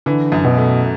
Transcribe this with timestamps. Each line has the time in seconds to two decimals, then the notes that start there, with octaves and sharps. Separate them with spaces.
0.06 D3 E3
0.32 F#2
0.44 B2
0.57 A3